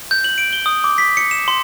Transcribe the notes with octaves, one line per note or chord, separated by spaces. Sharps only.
G6
F#7
D7
G7
D#6
D6
B6
C#7
E7
C6